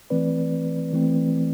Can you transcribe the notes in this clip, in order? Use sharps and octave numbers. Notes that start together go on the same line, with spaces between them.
E3 A3 C4 B4 D5
E3 A3 C4